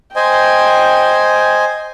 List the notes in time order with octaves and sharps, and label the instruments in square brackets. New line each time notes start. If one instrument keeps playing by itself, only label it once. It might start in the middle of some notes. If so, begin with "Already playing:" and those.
[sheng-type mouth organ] C5 D#5 G#5 [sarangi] G5